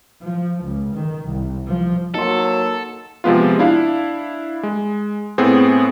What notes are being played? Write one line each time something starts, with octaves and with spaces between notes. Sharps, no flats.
F3
C#2
D#3
C2
F3
F#3 A#3 D#4 A4 C6
C3 F3 G#3 B3 F4
D4 E4 F5
G#3
A2 B3 C4 G#4